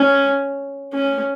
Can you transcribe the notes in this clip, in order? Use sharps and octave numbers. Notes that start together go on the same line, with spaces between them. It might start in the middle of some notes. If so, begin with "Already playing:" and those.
Already playing: C#4
C#4